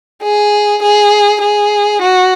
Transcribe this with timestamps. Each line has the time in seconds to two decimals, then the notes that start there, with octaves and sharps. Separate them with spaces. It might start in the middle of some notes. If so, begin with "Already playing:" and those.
0.23 G#4
0.83 G#4
1.42 G#4
2.02 F#4